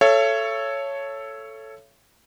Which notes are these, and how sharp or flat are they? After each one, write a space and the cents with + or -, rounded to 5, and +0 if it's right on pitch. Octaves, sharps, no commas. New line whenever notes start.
A4 +0 C#5 +0 E5 +40